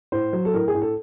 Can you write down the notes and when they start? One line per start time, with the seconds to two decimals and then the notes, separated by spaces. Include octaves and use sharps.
0.12 A2 C5
0.33 F#3
0.45 A4
0.54 A2 A#4
0.68 G#4
0.74 A2
0.82 A4